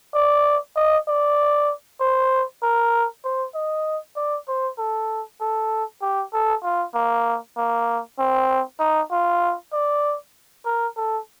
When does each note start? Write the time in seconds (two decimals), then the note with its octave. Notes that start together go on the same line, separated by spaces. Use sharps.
0.14 D5
0.76 D#5
1.08 D5
2.01 C5
2.63 A#4
3.24 C5
3.54 D#5
4.16 D5
4.48 C5
4.79 A4
5.41 A4
6.02 G4
6.34 A4
6.63 F4
6.94 A#3
7.57 A#3
8.19 C4
8.80 D#4
9.12 F4
9.73 D5
10.66 A#4
10.97 A4